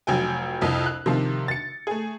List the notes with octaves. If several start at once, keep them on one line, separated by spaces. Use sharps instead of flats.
F1 F#3 G5 G#5
C2 F2
F#6
C3 D#3 F3
A6 C#7
A3 G#4